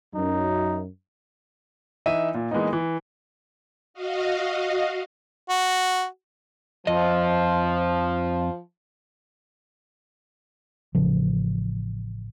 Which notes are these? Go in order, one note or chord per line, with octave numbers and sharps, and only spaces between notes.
F#2 D#4
E3 D#4 E5 D#7
A#2
E3 G#3 A#3 B3 D#4
E3
F#4 D#5 F5
F#4
F2 F3 D#5
A1 C#3 F3